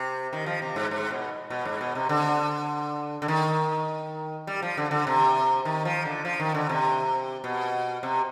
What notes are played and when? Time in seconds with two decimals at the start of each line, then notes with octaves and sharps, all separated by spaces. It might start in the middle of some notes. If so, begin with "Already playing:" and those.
Already playing: C3
0.33 D#3
0.46 F3
0.62 C3
0.76 G#2
0.91 G#2
1.11 B2
1.50 B2
1.65 G#2
1.81 B2
1.95 C3
2.09 D3
3.22 D3
3.28 D#3
4.47 G3
4.62 F3
4.77 D3
4.91 D3
5.07 C3
5.65 D#3
5.85 F3
6.05 D3
6.25 F3
6.40 D#3
6.54 D3
6.69 C3
7.44 B2
8.03 C3